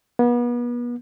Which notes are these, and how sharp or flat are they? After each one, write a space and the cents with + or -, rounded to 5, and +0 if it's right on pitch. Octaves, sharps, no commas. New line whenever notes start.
B3 -35